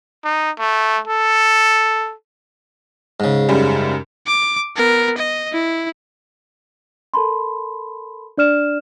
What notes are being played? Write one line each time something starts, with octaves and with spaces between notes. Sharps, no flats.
D#4
A3
A4
G#2 C#3
F#2 G3
D6
B3 A#4
D#5
E4
A4 A#4 A5 B5 C6
D4 D5 F6 E7